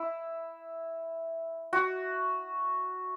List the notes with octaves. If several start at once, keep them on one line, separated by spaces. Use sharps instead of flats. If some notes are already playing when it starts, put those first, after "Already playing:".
Already playing: E4
F#4